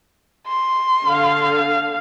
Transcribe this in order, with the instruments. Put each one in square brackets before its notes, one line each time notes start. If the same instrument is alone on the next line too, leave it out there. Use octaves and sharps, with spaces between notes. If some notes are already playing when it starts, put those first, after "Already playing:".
[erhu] C6
[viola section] D3 F5